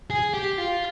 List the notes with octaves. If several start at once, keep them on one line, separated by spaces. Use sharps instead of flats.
G#4
G4
F4